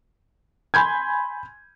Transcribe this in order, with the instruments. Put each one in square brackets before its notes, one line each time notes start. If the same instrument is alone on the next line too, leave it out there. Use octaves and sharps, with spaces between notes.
[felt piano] G#5 B5 C6 G6 G#6